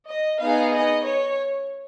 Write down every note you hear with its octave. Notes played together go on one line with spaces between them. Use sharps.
D#5
B3 D#4 G#4 F5
D#5
C#5